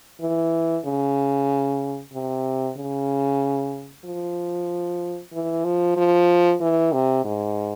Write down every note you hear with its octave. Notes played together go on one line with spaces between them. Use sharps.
E3
C#3
C3
C#3
F3
E3
F3
F3
E3
C3
G#2